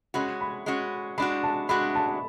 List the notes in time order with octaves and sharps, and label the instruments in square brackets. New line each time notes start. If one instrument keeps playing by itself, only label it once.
[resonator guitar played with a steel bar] G#3 C#4 F#4 [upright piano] B5
[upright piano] B5
[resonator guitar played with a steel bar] G#3 C#4 F#4
[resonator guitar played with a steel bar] G#3 D4 F#4 [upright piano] B5
[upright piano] A5
[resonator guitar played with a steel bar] G#3 D4 F#4 [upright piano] B5
[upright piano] A5